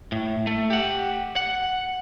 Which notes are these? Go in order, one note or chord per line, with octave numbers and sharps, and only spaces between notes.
A2
A3
G4 F#5
F#5